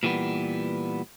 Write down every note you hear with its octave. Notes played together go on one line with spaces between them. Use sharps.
A#2 E3 G3 B3